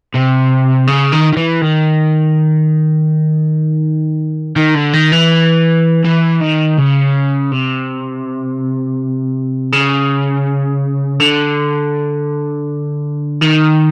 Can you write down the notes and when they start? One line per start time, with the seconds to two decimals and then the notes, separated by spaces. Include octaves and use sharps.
0.14 C3
0.87 C#3
1.13 D#3
1.33 D#3
1.37 E3
1.62 D#3
4.56 D#3
4.75 D3
4.93 D#3
5.12 E3
6.05 E3
6.41 D#3
6.78 C#3
7.52 C3
9.73 C#3
11.20 D3
13.42 D#3